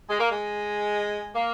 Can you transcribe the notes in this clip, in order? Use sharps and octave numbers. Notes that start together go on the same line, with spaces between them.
G#3
A#3
G#3
A#3